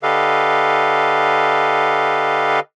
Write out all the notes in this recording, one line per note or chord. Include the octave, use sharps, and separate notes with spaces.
D3 G4 A4 B4 D#5 F5